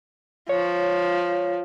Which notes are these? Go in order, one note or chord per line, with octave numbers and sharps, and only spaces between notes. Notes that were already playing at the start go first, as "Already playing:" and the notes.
F3 C#5